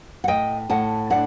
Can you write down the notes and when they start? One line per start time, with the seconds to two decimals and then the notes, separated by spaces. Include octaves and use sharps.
0.24 F#5
0.28 A2 D#5 G5
0.70 A2 F#5 A5
1.10 D4 D5 F#5